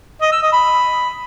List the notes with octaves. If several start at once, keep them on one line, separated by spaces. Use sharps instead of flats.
D#5
E6
D#5
B5